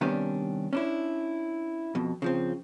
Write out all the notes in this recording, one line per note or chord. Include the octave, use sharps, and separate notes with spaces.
C3 D#3 G3 B3 C#4 D4
C#4 D4 E4
F2 B2
C#3 F3 C4